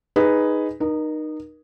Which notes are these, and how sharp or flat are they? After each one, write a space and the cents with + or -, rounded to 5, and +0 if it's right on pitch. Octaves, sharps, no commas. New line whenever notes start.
D#4 +0 G#4 +0 B4 +5
D#4 -20 A#4 +30